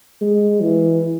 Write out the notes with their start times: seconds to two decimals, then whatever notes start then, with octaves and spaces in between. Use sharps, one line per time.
0.21 G#3
0.61 E3